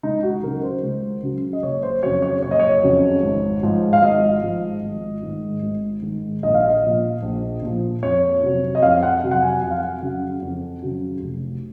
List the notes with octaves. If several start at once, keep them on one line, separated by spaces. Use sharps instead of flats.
C#2 D#4
F#4
C#3 F#3 A#4
C5
C#2
C#3 F#3
D#5
F#1 C#5
C5
F2 C#3 F#3 C#5
C#5
F#1 C#5
D#5
C#5
F2 C#3 F#3
G#1
G#2 F3
F5
G#1 D#5
G#2 F3
G#1
G#2 D#3
G#1
G#2 D#3
A#1 D#5
F5
D#5
A#2 F3
A#1
A#2 F3
F2 C#5
C3 F#3
D#5
F2 F5
F#5
C3 F#3
F#5
G#5
F2 F#5
F5
F#5
C#3 F#3
F2
C#3 F#3
F1